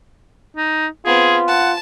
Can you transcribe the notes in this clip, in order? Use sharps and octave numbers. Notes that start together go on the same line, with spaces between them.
D#4
B3 C4 F4 G#4
F#5 A5